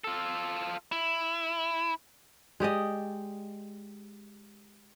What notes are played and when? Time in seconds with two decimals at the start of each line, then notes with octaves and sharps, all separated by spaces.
0.04 F4 A4
0.92 E4
2.60 G#3 G4 D5 D#5